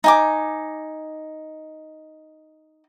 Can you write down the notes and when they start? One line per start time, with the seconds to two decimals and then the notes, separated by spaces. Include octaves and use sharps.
0.04 D#4 G#5 D6